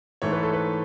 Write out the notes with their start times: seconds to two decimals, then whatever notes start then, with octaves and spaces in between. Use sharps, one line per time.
0.22 G#2 E3 A3 C#5
0.33 B4
0.43 A4
0.53 B4